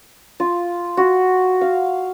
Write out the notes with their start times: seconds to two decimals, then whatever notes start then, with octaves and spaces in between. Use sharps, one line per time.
0.40 F4
0.97 F#4
1.61 F5